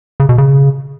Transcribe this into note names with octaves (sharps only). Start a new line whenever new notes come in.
C#3
B2
C#3